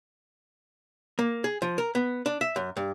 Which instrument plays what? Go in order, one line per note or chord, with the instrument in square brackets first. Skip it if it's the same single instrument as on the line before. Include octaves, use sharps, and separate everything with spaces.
[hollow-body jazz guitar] A#3
G#4
F3
A#4
B3
D4
E5
F#2
G2